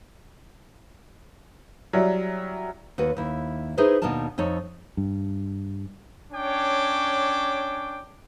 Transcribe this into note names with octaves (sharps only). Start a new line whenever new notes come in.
F#3 G3 E4
D#2 F#4 B4 C#5
D#2 E4
D#4 E4 G#4 B4 C5
D#2 B2 D4 D#4 A#4 A5
F2 D#4 A4 C#5
G2
C#4 D4 C#5 G5 D6